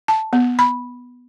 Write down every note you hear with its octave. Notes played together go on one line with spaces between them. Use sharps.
A5
B3
B5